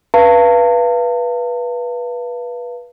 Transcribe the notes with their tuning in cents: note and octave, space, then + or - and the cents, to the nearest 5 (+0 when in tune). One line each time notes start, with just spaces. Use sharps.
B4 -20 F5 -30 A5 +40